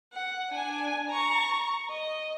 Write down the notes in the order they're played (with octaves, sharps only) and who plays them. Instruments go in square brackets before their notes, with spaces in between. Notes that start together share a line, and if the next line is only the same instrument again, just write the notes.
[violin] F#5
D4 G#5
A#5 C#6
D#5